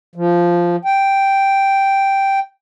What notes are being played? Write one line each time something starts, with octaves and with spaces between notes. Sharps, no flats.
F3
G5